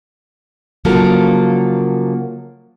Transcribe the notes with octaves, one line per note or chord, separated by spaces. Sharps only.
C#3 F3 F#3 A#3 A4